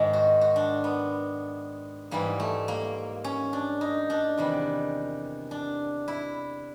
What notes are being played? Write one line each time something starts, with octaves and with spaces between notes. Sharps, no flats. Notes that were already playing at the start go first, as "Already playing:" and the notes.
Already playing: G#2 D#3 G#3
F#4
F#4
D4
B3
G#2 E3 G3 A#3
A3
A#3
C#4
D4
D#4
D4
E2 C3 D#3 G3
D4
E4